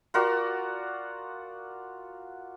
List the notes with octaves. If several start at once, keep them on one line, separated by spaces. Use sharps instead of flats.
F4 F#4 A#4 D5